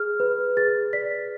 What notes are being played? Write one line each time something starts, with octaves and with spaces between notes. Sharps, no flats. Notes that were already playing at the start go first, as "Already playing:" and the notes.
Already playing: G#4 F6
B4
G#4 A6
D5 B6